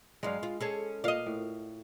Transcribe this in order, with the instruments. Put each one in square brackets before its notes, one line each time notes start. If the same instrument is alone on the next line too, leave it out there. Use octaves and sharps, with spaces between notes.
[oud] G2 F#3 [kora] G#3 F5
[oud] F4
C#4 G#4 A4
[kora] A#2 F5 [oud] D5 D#5
[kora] A2